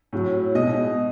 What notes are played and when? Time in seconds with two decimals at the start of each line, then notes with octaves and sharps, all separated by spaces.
0.13 A2 F#3
0.55 B2 G#3 D#5